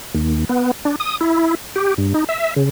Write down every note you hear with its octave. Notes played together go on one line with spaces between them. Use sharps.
D#2
B3
D4
D#6
E4
G4
G2
D#4
E5
C#3